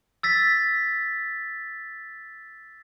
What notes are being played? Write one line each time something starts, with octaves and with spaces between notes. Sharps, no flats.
E6 A6 B6